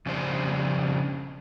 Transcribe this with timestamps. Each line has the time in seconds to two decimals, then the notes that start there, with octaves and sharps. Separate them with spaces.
0.06 F2 C#3 G3 D4 C5